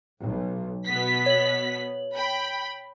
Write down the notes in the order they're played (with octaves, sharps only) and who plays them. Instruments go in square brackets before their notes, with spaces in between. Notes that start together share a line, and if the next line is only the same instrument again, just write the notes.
[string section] B1
B2 B3 B6
[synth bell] C#5 F#7
[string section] G5 B5